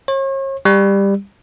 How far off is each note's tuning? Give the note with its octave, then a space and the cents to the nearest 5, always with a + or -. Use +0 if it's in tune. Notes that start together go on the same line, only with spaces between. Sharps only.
C#5 -40
G3 +15